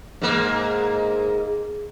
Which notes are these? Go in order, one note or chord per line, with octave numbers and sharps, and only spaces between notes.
G#2 A#3